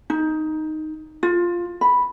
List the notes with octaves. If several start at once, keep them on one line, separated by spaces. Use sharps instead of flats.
D#4
F4
B5